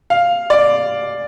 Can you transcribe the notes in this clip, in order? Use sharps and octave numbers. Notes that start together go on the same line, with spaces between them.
F5
D5